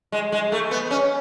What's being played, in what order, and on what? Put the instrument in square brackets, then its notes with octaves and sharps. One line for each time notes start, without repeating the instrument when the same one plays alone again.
[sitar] G#3
G#3
A3
B3
C#4